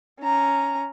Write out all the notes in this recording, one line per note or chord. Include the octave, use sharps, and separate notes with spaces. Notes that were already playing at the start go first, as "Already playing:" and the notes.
C#4 A#5